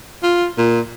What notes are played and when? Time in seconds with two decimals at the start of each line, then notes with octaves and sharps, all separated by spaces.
0.23 F4
0.58 A#2